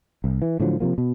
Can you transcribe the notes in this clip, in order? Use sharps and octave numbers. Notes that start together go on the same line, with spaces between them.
C2
E3
A2 D3 F3 F#3
C3 F3 A#3
B2